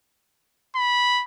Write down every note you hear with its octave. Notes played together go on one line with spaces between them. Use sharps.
B5